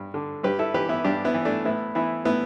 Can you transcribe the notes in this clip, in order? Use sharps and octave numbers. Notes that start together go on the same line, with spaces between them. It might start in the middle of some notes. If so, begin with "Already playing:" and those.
Already playing: G2
D3
G2 G4 B4
E4 A4
E3 G4 B4
B3 E4
G2 D4 G4
B3 E4
E3
A3 D4
A2 B3 E4
E3 B3 E4
A2 B3 E4